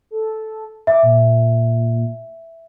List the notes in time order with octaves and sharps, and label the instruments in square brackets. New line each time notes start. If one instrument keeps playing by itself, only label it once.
[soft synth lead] A4
[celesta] E5 [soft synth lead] D6
[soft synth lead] A#2